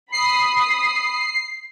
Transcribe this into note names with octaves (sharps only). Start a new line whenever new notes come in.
B5 D#6 C7